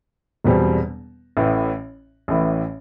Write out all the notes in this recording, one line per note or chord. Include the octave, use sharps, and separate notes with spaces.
E1 E2 B2 G3 C4
A1 A2 E3
A1 A2 E3